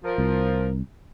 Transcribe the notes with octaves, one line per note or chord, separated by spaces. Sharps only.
F3 A#4
C2